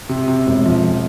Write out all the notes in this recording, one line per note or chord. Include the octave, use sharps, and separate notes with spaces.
C3
C3
E1
F3